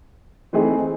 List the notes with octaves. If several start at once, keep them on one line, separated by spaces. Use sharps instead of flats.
E3 A3 C4 D#4 G#4